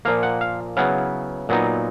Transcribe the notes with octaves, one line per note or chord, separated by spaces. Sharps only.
A#2 F3 A#3 F5
F#5
F5
C#3 F#3 B3 E4 F5
A#2 F#3 B3 D#4